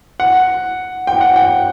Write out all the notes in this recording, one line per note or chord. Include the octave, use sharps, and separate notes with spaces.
F#5
G5
F#5
G5